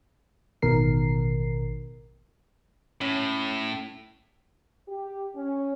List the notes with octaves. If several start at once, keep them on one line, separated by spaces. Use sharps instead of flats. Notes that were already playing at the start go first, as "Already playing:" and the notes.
A1 B2 D#3 A#4 C7
A2 C#4
G4
C#4